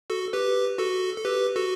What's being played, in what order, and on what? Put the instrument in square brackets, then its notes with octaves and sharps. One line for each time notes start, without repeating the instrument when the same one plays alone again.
[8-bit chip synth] F#4 A4
G4 B4
F#4 A4
A4
G4 B4
F#4 A4